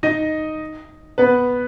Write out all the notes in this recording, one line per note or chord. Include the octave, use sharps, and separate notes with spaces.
D#4 D#5
B3 B4